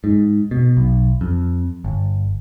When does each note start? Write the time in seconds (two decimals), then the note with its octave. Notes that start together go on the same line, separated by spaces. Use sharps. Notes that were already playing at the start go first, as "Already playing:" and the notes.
0.04 G#2
0.51 B2
0.77 B1
1.21 F2
1.84 G1